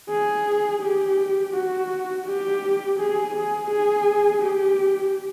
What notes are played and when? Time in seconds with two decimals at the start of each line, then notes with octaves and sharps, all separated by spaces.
0.09 G#4
0.81 G4
1.53 F#4
2.26 G4
2.99 G#4
3.34 G#4
3.70 G#4
4.42 G4